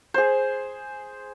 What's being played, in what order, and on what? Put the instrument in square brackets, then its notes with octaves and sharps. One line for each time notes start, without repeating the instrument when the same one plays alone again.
[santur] G#4 C5